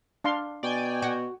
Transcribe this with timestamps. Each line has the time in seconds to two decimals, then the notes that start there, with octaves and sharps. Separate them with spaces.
0.24 D4 F5 C6
0.63 B2 D5 G5 G#5
1.02 F#4